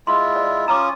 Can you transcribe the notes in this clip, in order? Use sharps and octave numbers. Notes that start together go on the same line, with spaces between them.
G#3 E4 F4 C6
D5
C#4 F4 A#5 D6 D#6